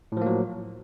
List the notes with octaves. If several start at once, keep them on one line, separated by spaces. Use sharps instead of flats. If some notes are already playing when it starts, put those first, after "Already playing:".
A2 F3 F#3 A#3